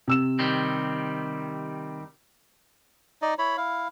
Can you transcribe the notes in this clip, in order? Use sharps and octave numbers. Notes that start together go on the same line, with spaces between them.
C3 E6 E7
D#3 G3 C4
D#4 D5 D#5
E4 C#5 B5
E4 F5